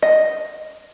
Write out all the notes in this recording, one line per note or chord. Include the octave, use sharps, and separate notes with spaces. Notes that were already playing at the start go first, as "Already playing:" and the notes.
D#5